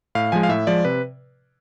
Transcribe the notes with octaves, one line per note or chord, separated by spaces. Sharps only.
A2 F5
F3 G#3 G#5
F5
A2 E5
F3 G#3 D5
C3 B4